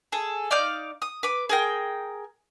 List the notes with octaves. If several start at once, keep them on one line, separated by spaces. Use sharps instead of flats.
G#4 A4
D#4 D5 F5 G6
D#6
B4 D6
G#4 A#4 G5